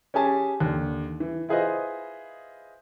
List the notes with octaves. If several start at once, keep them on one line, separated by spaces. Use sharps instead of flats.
C#4 G4 G#4 G#5 A5
D#2 D3
E3
E4 F4 G#4 B4 C5 D#5